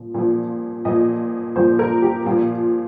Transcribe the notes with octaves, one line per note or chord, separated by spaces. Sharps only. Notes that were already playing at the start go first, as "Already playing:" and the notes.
Already playing: A#2 F3
A#2 F3
A#2 F3 D#5
A#2 F3 C5
A#4
G4
A#2 F3 F4